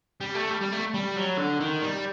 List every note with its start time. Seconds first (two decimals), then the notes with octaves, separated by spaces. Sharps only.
0.21 G3
0.35 A3
0.50 G3
0.61 G3
0.72 A3
0.94 G3
1.16 F#3
1.37 D3
1.60 D#3
1.81 G3